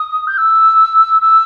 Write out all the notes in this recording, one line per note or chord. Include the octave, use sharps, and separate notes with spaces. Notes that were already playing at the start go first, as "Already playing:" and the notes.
Already playing: D#6
G6
E6
E6